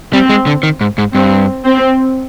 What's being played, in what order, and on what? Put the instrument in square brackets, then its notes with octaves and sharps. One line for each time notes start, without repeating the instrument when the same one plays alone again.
[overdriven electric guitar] G3 [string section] C4
[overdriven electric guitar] G#3
D3
D#3
G#2
G#2
[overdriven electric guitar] G2 [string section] C4
[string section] C4